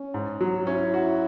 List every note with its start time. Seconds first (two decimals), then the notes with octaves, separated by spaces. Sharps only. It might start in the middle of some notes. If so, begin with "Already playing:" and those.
Already playing: C#4
0.14 G#2
0.41 F#3
0.67 C#4 E4
0.94 F#4